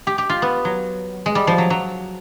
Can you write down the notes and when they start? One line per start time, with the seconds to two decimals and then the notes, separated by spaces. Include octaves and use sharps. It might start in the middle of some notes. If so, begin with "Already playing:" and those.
0.07 G4
0.18 G4
0.29 F4
0.42 B3
0.65 F#3
1.26 G#3
1.35 G3
1.47 F3
1.58 F#3
1.70 F#3